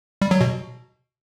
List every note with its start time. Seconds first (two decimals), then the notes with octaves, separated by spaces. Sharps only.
0.22 G3
0.31 F#3
0.41 B2